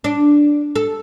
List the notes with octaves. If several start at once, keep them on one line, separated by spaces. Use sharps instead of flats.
D4
A4